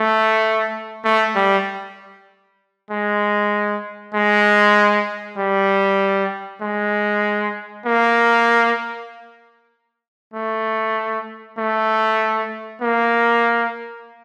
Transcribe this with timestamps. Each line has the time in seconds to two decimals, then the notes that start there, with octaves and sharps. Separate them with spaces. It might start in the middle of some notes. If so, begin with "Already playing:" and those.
Already playing: A3
1.04 A3
1.35 G3
2.91 G#3
4.14 G#3
5.38 G3
6.62 G#3
7.85 A#3
10.33 A3
11.58 A3
12.82 A#3